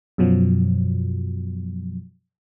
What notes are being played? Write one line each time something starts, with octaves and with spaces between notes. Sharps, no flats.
F#2 B2 F3 F#3